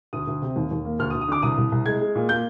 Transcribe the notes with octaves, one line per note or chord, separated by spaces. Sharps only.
D2 D#6
D2
C3
D#2
D#2
A#3
D2 F6
D#6
D2
D#6
D3 D6
C2 D#6
C2
C2
G#3 G#6
G#3
A#2
A#3 G6